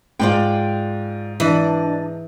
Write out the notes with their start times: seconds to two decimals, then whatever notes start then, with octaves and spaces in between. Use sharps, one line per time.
0.20 G#2 F4 D5 G5
1.40 E3 D4 D5 D#5